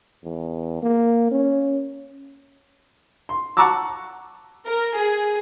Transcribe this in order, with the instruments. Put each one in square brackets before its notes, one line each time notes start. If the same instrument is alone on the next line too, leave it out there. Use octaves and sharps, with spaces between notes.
[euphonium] E2
A#3
C#4
[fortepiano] C6
F#5 A5 A#5 C#6 D6 E6
[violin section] A#4
G#4